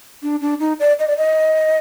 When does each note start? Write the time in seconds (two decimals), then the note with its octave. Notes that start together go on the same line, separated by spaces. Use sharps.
0.23 D4
0.41 D4
0.60 D#4
0.80 D5
0.99 D#5
1.07 D5
1.17 D#5